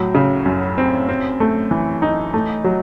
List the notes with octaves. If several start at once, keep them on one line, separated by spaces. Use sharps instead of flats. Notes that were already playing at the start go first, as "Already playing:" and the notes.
Already playing: A2 F#3
C#3
F#2
C4
C4
A3
E3
D#4
A3
F#3